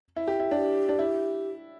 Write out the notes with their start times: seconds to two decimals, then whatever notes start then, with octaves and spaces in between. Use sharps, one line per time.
0.16 E4
0.28 G4
0.40 E4
0.51 D4 G4
0.89 D4
0.99 E4